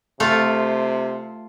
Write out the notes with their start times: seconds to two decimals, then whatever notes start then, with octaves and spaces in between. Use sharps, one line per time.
0.20 C3 A3 F4